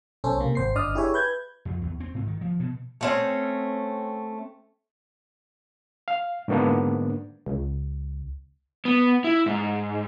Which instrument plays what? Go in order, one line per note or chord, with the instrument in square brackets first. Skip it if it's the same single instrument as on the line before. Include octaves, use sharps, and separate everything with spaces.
[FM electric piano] B1 C#4 A4 C5
C3 A#3
G#1 C5 C7
G1 D4 D5 D#5 D#6 F6
E4 G4 G#4 C#5 E5
B4 G6 G#6
[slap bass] F2
E2
C4
G#2
D#3
F3
B2
[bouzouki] A3 C4 C#4
[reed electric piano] F5
G#2 D3 A#3 B3 D4
[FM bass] C#2
[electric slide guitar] B3
E4
G#2